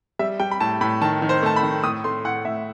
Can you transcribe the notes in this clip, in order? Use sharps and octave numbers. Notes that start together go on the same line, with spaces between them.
G3 E5
G3 G5
B5
A2 A5
A2 B5
D#3 A5
D#3
C5
A3 A5
B5
D#3
A2 D#6
A3 C6
A2 F#5
A2 E5